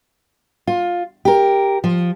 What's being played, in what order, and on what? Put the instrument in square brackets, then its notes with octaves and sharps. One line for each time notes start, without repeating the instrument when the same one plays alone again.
[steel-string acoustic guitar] F4
G4 A#4
F3